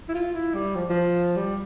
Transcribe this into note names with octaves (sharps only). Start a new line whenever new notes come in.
E4
F4
E4
G3
F3
F3
G3